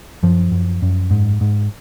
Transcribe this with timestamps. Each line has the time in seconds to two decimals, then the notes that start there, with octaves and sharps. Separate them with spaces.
0.23 F#2 F3
0.52 F#2
0.82 F#2
1.11 G#2
1.41 G#2